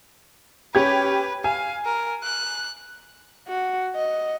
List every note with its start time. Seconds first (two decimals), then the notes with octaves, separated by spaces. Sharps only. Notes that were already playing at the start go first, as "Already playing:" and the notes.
0.75 C#4 G4 B4 G#6
1.44 F5 G#5
1.85 A#4
2.23 F#6
3.48 F#4
3.95 D#5